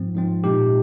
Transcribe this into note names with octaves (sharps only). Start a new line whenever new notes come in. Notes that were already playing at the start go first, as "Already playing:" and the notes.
Already playing: G#2 F3 C4
G#2 F3 C4
A#2 G#3 D#4 G4